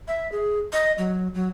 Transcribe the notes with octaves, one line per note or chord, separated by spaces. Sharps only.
E5
G#4
D#5
F#3
F#3